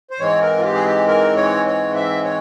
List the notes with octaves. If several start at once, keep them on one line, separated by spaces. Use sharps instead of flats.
C5
G#2 E3 G#3 C4 C#5
A#4
F4
G4
G#4
G4
A#4
C#5
C#5
E5
C#5